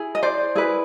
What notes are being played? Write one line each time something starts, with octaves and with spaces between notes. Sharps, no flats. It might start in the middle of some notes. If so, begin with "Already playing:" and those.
Already playing: E4 G#4
D#5
C5 D5
E4 G#4 B4